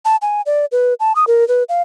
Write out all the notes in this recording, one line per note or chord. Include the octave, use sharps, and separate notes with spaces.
A5
G#5
D5
B4
A5
D#6
A#4
B4
F5